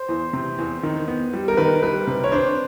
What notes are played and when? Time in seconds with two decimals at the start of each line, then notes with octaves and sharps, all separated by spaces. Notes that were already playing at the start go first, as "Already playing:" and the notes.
Already playing: C5
0.09 E2
0.33 C3
0.59 E2
0.83 D#3
1.08 B3
1.34 G3
1.48 A#4
1.57 D#3 B4
1.83 G3 B4
2.07 C3
2.24 C#5
2.32 D4 C5